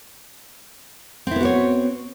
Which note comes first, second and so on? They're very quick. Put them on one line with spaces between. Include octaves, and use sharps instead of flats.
C4 E4 B3 F#4 C#5